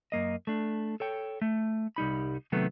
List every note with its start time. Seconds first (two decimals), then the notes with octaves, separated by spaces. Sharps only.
0.12 F#2 A#3 D#5
0.47 A3 D4
1.00 A4 C#5 G5
1.42 A3
1.96 C2 G3 D#4 B5
2.52 C3 D#3 F#3 A3 B3